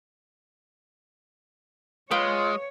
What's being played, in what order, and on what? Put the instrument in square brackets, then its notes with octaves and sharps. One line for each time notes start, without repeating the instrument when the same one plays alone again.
[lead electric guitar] G#3 [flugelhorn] F4 [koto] B4 F5 G5 [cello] C#5